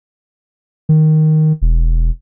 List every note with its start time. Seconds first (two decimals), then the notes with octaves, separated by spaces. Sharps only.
0.89 D#3
1.62 E1